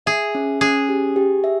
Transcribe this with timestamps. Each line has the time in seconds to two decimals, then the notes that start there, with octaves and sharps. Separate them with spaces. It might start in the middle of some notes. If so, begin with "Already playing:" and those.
0.06 G#4 E5
0.35 C#4
0.61 C#4 G#4
0.89 G4
1.16 G4
1.44 E5